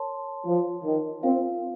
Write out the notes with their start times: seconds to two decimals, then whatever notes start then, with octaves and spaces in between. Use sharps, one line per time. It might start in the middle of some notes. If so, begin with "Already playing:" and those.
Already playing: A#4 C#5 A5 C6
0.46 F3
0.84 D#3
1.23 C4 F4 A#4 F5